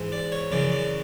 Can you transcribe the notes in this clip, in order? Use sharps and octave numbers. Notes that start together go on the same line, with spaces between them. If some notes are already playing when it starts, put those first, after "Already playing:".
Already playing: G#2 E3
D5
C#5
F#2 C#3 E3 D5
D5